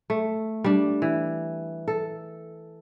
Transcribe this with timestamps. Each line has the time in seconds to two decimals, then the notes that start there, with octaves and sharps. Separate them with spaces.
0.10 A3
0.64 G3 D4
1.02 E3
1.88 A4